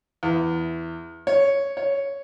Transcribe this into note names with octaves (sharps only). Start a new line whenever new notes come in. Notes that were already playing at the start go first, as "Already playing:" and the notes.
E2
C#5
C#5